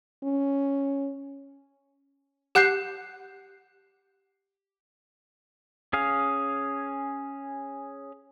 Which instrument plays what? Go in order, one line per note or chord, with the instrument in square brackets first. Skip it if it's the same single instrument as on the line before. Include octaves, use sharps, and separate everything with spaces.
[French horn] C#4
[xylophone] G4 F#5 F#6 G6 C7
[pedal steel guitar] C#4 G#4 F5